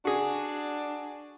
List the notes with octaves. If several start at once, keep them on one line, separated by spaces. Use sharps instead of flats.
D4 F#4 G#4